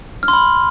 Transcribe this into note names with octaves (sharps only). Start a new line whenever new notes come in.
F6
C6
B5